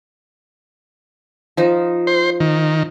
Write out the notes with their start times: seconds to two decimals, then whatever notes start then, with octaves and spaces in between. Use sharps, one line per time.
1.57 F3 D#4
2.07 C5
2.40 D#3